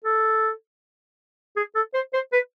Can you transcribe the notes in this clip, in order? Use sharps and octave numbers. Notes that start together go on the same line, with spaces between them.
A4
G#4
A4
C5
C5
B4